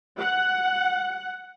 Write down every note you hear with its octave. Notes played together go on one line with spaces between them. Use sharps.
F#5